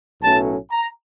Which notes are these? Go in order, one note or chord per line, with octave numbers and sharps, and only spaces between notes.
B1 A2 F#3 A3 C#4 A5
A#5